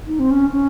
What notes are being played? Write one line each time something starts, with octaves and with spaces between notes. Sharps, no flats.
D#4
C4
C#4
C#4